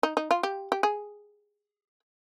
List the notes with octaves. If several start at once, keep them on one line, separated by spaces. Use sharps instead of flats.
D#4
D#4
F4
G4
G4
G#4